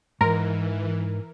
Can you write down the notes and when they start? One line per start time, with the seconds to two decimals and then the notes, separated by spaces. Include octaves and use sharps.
0.21 G#2 E3 A#4